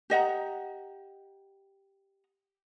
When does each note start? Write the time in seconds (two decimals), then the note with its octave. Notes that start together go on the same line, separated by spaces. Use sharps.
0.10 G4 D#5 F#5 A#5